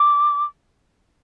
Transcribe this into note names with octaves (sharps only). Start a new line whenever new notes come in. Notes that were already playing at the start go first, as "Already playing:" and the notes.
Already playing: D6